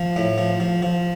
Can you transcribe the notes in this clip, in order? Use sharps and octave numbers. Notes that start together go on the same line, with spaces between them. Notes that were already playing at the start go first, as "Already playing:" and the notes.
Already playing: F3
A2
F3
F3
F3